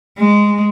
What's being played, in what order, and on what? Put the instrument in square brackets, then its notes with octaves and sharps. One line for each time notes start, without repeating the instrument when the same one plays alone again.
[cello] G#3